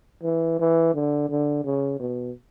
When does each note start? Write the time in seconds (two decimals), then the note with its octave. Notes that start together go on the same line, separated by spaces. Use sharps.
0.23 E3
0.59 E3
0.94 D3
1.29 D3
1.65 C#3
2.00 B2